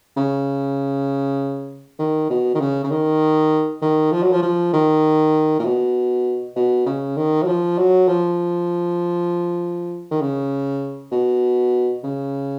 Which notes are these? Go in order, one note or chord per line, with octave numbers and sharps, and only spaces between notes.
C#3
D#3
B2
D#3
C#3
C#3
D#3
D#3
F3
F#3
F3
F3
D#3
A#2
B2
B2
C#3
D#3
F#3
F3
F#3
F3
D#3
C#3
B2
C#3